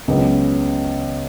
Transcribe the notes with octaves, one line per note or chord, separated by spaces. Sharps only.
C#2 C#3 F#3 B3